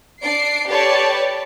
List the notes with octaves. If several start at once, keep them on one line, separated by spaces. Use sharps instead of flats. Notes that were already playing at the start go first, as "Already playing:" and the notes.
D4 C7 D7
G4 A4 B4 C#5 D5 A5